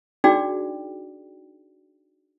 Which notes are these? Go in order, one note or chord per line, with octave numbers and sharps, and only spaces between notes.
D4 D#4 F#4 G#4 D5 G5